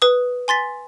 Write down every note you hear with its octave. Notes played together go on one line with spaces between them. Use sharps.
B4 D#6
G#5 C6 A6 B6